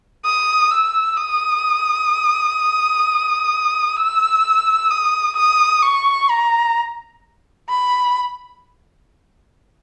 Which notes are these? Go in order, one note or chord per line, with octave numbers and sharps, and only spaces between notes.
D#6
E6
D#6
E6
D#6
D#6
C#6
A#5
B5